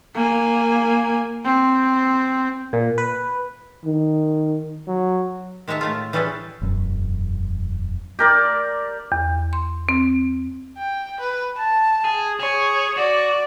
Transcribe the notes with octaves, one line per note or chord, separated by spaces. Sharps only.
A#3 G#5
C4
A#2
B4
D#3
F#3
D#3 G#3 C#5 E5 A5
A2 A3 F4
E3 G3 C#4 G#4 A4 B4
E1 F#2
G4 A#4 D5
E2
C6
C4
G5
B4
A5
G#4
G#4 C#5
F#4 D5